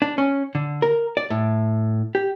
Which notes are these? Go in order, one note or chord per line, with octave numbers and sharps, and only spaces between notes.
D4
C#4
D3
A#4
D5
A2
G4